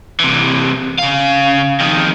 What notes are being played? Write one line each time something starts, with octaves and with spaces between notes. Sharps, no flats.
C3 E3
C#3 F5
F2 D#3